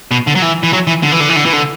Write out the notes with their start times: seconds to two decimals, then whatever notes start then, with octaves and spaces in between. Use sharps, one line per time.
0.11 B2
0.27 D3
0.35 F#3
0.42 E3
0.63 E3
0.73 F#3
0.87 E3
1.03 D3
1.12 E3
1.20 D3
1.29 E3
1.36 D3
1.45 E3
1.53 D3